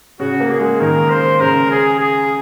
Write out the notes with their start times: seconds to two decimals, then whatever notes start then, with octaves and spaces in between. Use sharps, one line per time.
0.20 C#3 F#4
0.40 A#3
0.51 G#4
0.60 G#3
0.80 D#3 A#4
1.10 C5
1.40 C#3 A#4
1.70 G#4
2.00 G#4